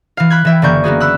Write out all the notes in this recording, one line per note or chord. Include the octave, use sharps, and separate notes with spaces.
E3 F5
B5 F#6 G#6
E3 E5 G5
F#1 D3 A#3 D5 C#6 G6
A#3 B3 F#4 G#4
B5 E6 F#6